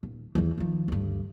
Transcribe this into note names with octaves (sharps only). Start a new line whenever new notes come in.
D#1
E2 E3
D#3 F3
D2 G2